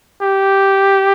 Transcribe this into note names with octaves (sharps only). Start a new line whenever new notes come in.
G4